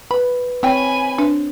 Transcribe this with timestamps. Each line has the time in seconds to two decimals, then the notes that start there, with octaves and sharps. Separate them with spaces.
0.11 B4 B5
0.63 C4 E4 C#5 G5 G#5 B5
1.18 D4 B4